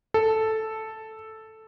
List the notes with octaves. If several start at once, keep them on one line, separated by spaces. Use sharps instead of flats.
A4